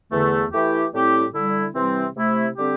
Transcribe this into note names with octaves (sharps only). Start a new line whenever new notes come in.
E2 D3 A3
E3 A3 E4 G4
A2 G3 C4 E4 G4
D3 G3 E4
C3 E3 G3 C4
C3 A3 E4
D3 G3 C4 G4